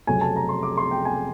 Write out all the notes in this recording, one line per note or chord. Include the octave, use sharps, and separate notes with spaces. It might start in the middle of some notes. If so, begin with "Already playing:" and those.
F1 F2 C#3 F#3 G#5
A5
A#5
C6
D6
C6
G5
G#5